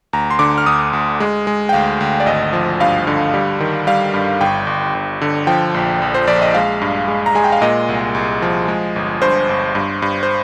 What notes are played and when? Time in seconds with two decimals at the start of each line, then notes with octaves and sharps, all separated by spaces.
0.13 D2 A#5
0.31 C6
0.39 D3 D6
0.58 F6
0.66 D2 D#6
0.93 D2
1.20 G#3
1.47 G#3
1.69 G5
1.73 D2 F5
2.01 D2
2.20 D5
2.26 G#1 D#5
2.53 F3
2.80 G2 F5
3.07 D3
3.34 G3
3.60 D#3
3.87 G3 F5
4.14 G2
4.41 G1 G5
4.67 G1
4.95 G1
5.21 D3
5.47 F3 G5
5.74 A#1
6.02 A#1
6.15 C5
6.27 A#1 D5
6.42 D#5
6.55 G#3 F5
6.82 G2
7.08 G#3
7.26 A#5
7.35 G#3 G#5
7.44 G5
7.52 F5
7.62 A#2 D#5
7.89 C2
8.15 C2
8.42 F3
8.68 G#3
8.96 G1
9.22 G2 C5
9.49 G1
9.75 G2
10.02 G2
10.23 C5